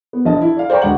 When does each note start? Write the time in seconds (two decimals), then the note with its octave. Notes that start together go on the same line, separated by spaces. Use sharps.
0.13 B3
0.25 A#1 D#5 A5
0.41 E4
0.56 D5 F5
0.70 C5 D5 G5 A#5 C#6
0.82 D2 G#3 B4 F#5 F#7